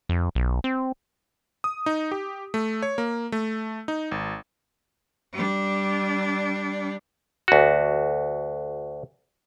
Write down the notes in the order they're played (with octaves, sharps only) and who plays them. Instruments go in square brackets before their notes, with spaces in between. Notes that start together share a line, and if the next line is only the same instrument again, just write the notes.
[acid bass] F2
B1
C4
[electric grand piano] D#6
D#4
G4
A3
C#5
A#3
A3
D#4
G#1
[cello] G3 D4
[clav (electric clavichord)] D2 F#4